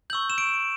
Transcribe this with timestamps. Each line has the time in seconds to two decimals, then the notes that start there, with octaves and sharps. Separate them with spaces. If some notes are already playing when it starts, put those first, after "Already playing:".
0.10 C#6 E6 G6 F#7
0.30 E7
0.38 D7